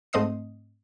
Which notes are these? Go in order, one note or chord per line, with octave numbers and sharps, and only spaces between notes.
G#2 A3 C4 D#5 D#6 C7